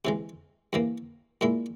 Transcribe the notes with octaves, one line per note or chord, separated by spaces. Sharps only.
C3 E3 G#3
G2 E3 A#3
A#2 G#3 E4